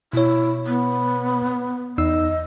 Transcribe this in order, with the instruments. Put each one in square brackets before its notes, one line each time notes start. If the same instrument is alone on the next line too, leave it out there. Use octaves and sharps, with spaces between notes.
[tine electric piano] B2 C#5 [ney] E4
[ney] B3
[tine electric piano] E2 D#4 E6 [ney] D#5